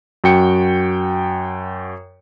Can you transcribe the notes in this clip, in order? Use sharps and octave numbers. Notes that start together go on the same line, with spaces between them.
F#2 F#4 G5 C#7